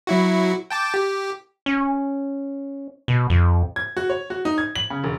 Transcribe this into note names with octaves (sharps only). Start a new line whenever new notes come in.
F#3 E4 F#4
G5 A5 D6
G4
C#4
B2
F2
G#6
F#4
C#5
F#4
D#4
G#6
F#7
C#3
E1